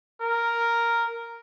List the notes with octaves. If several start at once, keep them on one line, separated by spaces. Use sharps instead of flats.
A#4